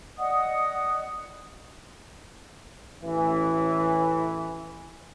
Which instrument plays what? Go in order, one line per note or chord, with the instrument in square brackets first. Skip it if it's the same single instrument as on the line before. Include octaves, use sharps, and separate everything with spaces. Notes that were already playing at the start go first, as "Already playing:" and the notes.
[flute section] D5 D#5 F#5 D#6
[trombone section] A1 E3